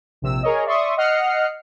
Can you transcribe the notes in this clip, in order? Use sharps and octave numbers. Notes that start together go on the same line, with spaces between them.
A#1 C3 E6
G#4 A#4 C#5 D#5
D5 E5 C6 C#6 D#6
D#5 F#5 F6 C7 C#7